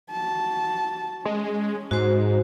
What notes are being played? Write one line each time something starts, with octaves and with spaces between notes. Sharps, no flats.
F#4 A5
G#3 C#4
G#2 F#4 C5